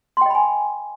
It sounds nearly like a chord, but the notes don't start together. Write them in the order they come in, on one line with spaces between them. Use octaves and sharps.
C6 G5 D#5 B5 G#5